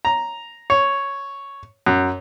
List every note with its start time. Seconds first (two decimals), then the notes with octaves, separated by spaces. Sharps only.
0.05 A#5
0.70 C#5
1.86 F#2